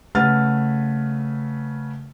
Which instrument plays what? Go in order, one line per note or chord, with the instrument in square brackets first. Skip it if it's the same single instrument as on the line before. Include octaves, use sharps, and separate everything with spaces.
[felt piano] C#3 A3 B4 F#5 F6 A6